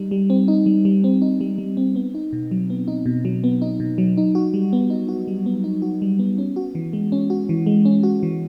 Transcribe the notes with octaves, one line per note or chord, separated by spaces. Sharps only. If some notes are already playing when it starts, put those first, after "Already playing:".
Already playing: G3 D#4
G3
C4
D#4
G3
G3
C4
D#4
G3
G3
C4
B3
D#4
B2
F#3
B3
D#4
B2
F#3
B3
D#4
B2
F#3
D#4
F#4
G3
B3
D#4
F#4
G3
B3
D#4
F#4
G3
B3
C#4
F#4
E3
G#3
C#4
F#4
E3
G#3
C#4
F#4
E3